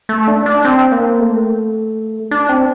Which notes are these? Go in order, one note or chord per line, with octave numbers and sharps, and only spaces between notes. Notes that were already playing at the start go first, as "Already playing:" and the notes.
A3
D4
D4
C4
A#3
A3
D4
C4